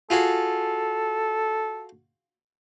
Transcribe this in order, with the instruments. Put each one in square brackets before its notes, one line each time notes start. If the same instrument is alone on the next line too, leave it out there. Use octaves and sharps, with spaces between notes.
[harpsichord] F4 F#4 G#4 [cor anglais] A4